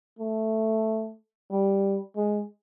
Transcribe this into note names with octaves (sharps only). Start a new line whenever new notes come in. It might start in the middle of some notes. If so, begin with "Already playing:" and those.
A3
G3
G#3